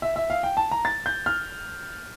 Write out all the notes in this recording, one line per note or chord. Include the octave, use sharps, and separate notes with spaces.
E5
E5
F5
G5
A5
A#5
A6
G6
F6